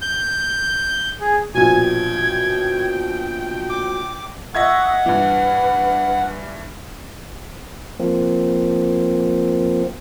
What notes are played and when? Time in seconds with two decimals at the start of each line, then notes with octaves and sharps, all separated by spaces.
0.01 G6
1.20 G#4
1.54 A#1 B2 G#5 G#6
1.83 G5
3.69 D6
4.55 D#5 E5 F#5 C#6 E6 F#6 G#6
5.06 G2 E3 B4
7.99 F3 A#3 C4